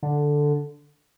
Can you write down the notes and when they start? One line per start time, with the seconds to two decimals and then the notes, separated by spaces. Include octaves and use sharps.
0.03 D3